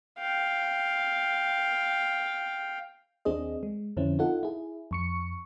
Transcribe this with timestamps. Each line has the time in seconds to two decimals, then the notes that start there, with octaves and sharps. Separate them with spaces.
0.19 F5 G5
3.25 D#2 C4 D4 G#4 D#5
3.63 G#3
3.97 F2 D3 C4 C#4 E4
4.19 D#4 F4 A4 F#5
4.43 E4 G#4
4.91 F2 C#6 C#7